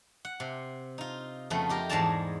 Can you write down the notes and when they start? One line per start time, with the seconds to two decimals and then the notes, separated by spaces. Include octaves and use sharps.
0.25 F#5
0.40 C3
0.98 D#4 F4
1.50 F2 C#3 A3 B3
1.69 D#4 G4 A#4
1.89 E2 G#2 G#3 D5 A5 A#5